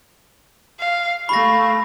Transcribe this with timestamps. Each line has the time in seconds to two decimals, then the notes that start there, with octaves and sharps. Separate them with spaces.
0.79 F5
1.29 A3 F5 B5 C#6 A#6